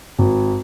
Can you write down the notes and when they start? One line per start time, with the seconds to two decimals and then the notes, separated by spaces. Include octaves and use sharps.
0.19 G#1